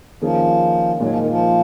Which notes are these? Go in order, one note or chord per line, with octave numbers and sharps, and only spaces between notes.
D#3 F3 A#3 C#4 G#4
A#2 F#3 G#3 D#4
F3
D#3
F3